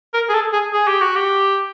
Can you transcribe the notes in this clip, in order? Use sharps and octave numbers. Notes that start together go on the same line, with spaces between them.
A#4
G#4
A4
G#4
G#4
G4
F#4
G4